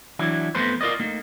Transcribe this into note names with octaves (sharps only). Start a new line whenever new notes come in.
E3 F#3 D4 E4
F2 A3 B3 B4 C5
F4 A#4 D5 D#5
A3 A#3 D#4